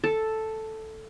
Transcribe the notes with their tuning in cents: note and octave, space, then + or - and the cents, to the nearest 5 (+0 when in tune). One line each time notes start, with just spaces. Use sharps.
A4 +0 A5 +0